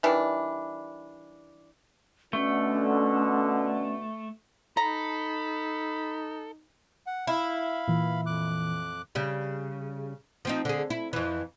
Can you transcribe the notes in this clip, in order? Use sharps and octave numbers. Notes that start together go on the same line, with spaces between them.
D#3 E3 G3 D4
B2 D3 A3 C#4
D#4 A4 A#5 B5
F#5
E4 F5 B5
A#2 E3
F2 D6 F#6
C#3 G3
F3 C4 D#4
D3 G#4
E4
F2 E3